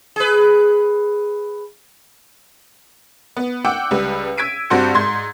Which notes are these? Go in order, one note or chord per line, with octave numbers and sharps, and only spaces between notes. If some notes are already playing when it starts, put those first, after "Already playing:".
G#4 B4
B3
F#5 G5 D6 E6
C#2 G3 B4
E6 G#6 B6 D7 D#7
G2 C4 F#4 C6 G6 C#7
G#2 C6 G#6